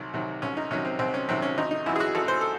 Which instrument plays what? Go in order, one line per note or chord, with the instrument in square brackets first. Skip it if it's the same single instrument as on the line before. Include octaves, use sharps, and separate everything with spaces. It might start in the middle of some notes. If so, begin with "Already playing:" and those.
Already playing: [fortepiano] C2 C3 D#3 F#3
C3 D#3 F#3
C2 C#4
D#4
C3 D#3 F#3 C#4
C4
C2 C4
C#4
C3 D#3 F#3 C4
C#4
G#1 D#4
D#4
F#2 E3 E4
G#4
F#4
G#1 A4
C5
A4